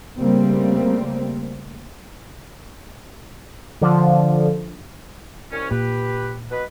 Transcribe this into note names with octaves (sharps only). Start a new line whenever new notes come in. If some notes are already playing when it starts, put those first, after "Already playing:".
C#3 G3 A3 A#3 C4
D3 F3
C2 C#4
A#2 G4 B4
B2 B4